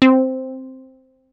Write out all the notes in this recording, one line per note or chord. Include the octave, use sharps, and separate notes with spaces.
C4